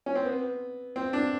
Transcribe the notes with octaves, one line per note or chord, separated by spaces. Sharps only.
C#4
C4
B3
C4
D4